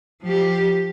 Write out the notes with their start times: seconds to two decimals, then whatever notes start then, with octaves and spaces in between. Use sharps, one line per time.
0.23 F3 G4